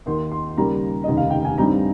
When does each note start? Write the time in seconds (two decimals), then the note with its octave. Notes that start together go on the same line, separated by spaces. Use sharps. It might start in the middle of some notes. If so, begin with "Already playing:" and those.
0.06 D#2 D#3 A#3 D#4 C6
0.32 C6
0.57 D#2 C#3 G3 A#3 A#5
1.04 F1 D#2 C#3 D#5
1.17 F5
1.30 G5
1.45 G#5
1.58 G2 G3 C4 D#4 A#5